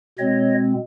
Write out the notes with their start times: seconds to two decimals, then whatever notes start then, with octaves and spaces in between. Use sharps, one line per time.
0.18 B2 G#3 C4 C#5 D#5